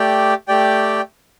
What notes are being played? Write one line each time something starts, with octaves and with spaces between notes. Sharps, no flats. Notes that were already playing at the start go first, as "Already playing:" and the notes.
Already playing: A3 G4 D5 G5
A3 G4 D5 G5